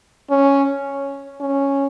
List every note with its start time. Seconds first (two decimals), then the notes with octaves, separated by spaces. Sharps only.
0.30 C#4
1.41 C#4